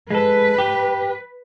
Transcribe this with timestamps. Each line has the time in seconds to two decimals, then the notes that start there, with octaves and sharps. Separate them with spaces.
0.11 G#3 A4 B4
0.58 G4